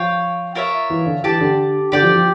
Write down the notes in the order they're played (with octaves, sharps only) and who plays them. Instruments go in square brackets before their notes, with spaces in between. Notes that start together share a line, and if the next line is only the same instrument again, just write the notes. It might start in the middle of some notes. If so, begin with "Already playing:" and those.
Already playing: [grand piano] F3 [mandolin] F4 C#5 G5
[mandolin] F4 A#4 C#5 E5
[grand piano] E3
D3
[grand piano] E3 [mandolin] G4 D5 A5
[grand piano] D3
[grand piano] D3 [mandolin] G4 D5 G5
[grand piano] F3
F3